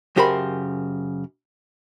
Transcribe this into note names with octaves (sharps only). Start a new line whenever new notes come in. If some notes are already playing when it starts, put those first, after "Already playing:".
F#2 C#3 G4 A#4 C5 B5